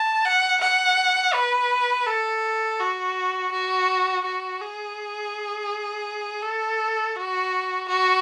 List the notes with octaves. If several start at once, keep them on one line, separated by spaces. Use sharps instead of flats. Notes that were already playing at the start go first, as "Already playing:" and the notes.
Already playing: A5
F#5
F#5
B4
A4
F#4
F#4
F#4
G#4
A4
F#4
F#4